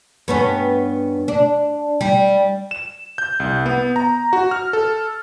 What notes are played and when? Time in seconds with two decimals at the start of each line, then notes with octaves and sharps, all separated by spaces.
0.28 G2 B3 C#4
1.28 D4
2.01 G3
2.71 E7
3.18 G6
3.40 C2
3.66 B3
3.96 A#5
4.33 F#4
4.51 F6
4.73 A4